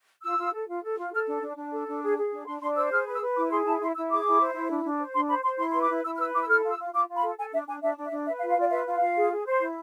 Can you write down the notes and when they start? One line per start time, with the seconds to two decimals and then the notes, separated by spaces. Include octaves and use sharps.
0.23 F4 E6
0.38 F4
0.54 A4
0.69 F4
0.83 A4
0.98 F4
1.13 A4 F6
1.28 D4
1.42 D4
1.57 D4
1.73 A4
1.88 D4
2.02 G#4
2.17 G#4
2.32 D4
2.47 D4 C6
2.61 D4 C6
2.76 C5 E6
2.91 G#4 F6
3.07 B4
3.14 E6
3.21 B4
3.35 E4 D6
3.51 G#4 C6
3.65 E4 A5
3.81 E4 C6
3.95 E4 E6
4.11 G#4 D6
4.25 E4
4.40 C5
4.55 E4
4.70 D4
4.85 D4
5.00 C5
5.15 D4 C6
5.29 C5 B5
5.44 C5 C6
5.59 E4 C6
5.71 B4 C6
5.81 D6
5.90 E4
6.04 E4 E6
6.15 F6
6.19 B4 E6
6.34 E4 D6
6.42 E6
6.48 A4 F6
6.63 F4
6.70 E6
6.78 F4
6.93 F4 D6
7.08 F4
7.16 B5
7.23 A4
7.37 A4 G#5
7.52 D4 E5
7.68 D4 G#5
7.82 D4 E5
7.97 D4
8.05 E5
8.12 D4
8.27 B4 E5
8.38 F5
8.43 F4
8.49 F5
8.57 F4 D5
8.71 B4 E5
8.86 F4
8.95 F5
9.01 F4
9.17 G#4
9.32 G#4
9.46 C5
9.61 E4